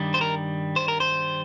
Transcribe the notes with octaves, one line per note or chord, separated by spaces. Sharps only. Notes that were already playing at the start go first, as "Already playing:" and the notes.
Already playing: G2 D#3 G3
C5
A#4
C5
A#4
C5